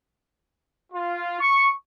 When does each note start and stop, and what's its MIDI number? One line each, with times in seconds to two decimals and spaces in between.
0.93 1.37 65
1.40 1.67 85